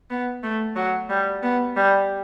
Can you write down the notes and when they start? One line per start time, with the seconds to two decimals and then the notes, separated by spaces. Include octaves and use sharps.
0.10 B3
0.43 A3
0.76 F#3
1.09 G3
1.43 B3
1.76 G3